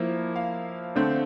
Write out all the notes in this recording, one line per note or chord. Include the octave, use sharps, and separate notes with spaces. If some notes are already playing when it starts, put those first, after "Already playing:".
Already playing: F3 A#3 E4
F5
D3 A3 C4